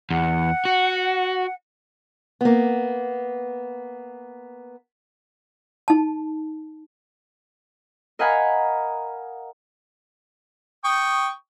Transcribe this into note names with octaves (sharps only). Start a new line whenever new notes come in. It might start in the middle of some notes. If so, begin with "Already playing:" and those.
E2 F#5
F#4
A#3 B3
D#4 A5
A#4 D#5 F5 F#5 G#5 B5
G5 C#6 D#6